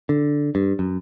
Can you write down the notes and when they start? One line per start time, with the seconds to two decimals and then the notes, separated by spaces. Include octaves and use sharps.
0.09 D3
0.55 G2
0.79 F#2